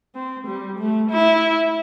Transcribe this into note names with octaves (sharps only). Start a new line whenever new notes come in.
C4
G3
A3
E4